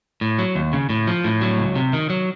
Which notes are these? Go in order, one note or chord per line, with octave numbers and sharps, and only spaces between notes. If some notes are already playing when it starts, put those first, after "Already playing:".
A2
F#3
D#2
C#3
A2
F3
A2
F#3
C#2
C3
D#3
F#3